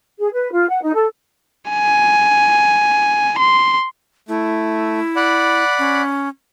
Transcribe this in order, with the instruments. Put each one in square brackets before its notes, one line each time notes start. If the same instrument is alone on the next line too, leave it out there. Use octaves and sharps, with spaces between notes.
[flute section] G#4
B4
F4
F#5
D#4
A4
[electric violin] G#5
C6
[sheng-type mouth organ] A3 [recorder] E4
[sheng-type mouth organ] D5 F#5 B5
[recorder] C#4